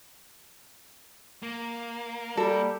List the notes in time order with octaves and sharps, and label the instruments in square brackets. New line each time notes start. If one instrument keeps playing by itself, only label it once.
[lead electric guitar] A#3
[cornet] G3 [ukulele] A4